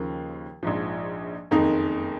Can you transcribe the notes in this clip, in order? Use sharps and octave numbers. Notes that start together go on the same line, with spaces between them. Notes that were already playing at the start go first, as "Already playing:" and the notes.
Already playing: D#2 C#3 F3 A#3
A#1 G#2 F3
F#1 F2 D#3 A#3 D#4